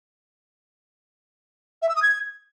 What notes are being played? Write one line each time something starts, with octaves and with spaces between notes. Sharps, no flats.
E5
E6
D#6
G#6